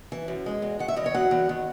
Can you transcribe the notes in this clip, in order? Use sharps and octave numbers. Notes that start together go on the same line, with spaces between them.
E3
F#2
G#3
E2
D#3 F#5
E5
E2 D#5
C#5
F#3 F#5
E2
D#3